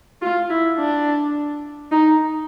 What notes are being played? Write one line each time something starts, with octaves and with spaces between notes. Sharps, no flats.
F4
E4
D4
D#4